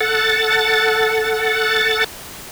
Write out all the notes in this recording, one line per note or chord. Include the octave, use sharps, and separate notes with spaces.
A4 F#5 A6